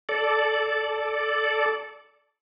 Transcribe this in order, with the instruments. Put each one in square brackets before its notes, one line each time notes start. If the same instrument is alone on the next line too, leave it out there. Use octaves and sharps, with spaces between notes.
[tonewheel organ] A4 D5